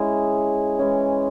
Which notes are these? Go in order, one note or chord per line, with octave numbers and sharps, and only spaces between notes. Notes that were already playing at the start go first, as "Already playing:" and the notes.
Already playing: G#3 C#4 E4
E3 G#3 C#4